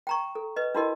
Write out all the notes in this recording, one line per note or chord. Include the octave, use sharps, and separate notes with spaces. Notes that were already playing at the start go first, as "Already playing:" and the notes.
G5 A#5 C#6
A4
B4 D#5
D4 E4 F#4 G4 A#4 D#5